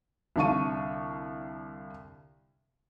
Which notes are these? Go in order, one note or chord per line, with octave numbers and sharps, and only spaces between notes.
C2 D3 D4 F5 C#6 D#7